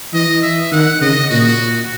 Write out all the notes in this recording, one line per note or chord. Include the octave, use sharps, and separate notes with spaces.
E3 D#5
E5
D#3 F#5
C#3 D#5
A#2 F#4